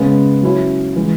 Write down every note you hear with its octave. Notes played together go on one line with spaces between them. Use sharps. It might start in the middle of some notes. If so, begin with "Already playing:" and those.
Already playing: C#3 G#3 B3
F#3 C#4 E4
E3 G#3 E4